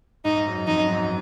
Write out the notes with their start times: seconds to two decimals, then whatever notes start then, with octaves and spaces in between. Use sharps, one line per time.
0.25 G#2 D#4
0.37 G#2
0.46 F#2
0.67 F2 D#4
0.78 F#2
0.88 G#2
0.94 F#2